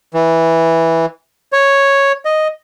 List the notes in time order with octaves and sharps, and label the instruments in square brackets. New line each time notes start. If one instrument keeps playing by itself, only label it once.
[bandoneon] E3
C#5
D#5